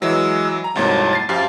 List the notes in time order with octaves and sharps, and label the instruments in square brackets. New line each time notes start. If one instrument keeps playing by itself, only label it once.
[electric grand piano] E3 F#3 [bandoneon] G#3 E6
[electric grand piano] A#5
[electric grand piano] C2 G#2 A#3 [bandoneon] F2 F#3 A5
[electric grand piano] A6 C7
[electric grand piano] F#2 G4 F5 [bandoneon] F3 A5